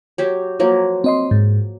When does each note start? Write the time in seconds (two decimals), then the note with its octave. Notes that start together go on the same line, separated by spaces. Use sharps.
0.18 F#3 G4 C#5
0.59 F3 F#3 A#3
1.04 C4 D#5 C6
1.31 G#2